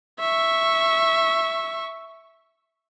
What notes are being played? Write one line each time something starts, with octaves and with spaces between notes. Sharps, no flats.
E5 C#6